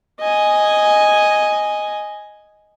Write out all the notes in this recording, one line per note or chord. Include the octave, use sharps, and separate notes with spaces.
D#5 G#5